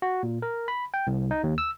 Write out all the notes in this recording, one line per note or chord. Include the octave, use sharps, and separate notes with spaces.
F#4
A#2
A#4
B5
G5
C2
D#4
D#2
E6